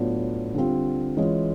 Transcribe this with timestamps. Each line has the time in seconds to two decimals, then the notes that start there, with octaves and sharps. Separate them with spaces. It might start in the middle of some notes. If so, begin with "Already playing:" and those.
Already playing: A2 F#3 B3 D4 F4
0.54 D3 G3 C4 F4
1.17 E3 G#3 C#4 F4